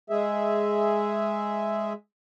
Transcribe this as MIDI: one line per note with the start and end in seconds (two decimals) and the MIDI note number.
0.10 1.93 56
0.10 1.93 68
0.10 1.93 76